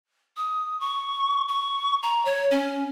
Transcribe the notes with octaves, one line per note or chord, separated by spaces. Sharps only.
D#6
C#6
C#6
A#5
C#5
C#4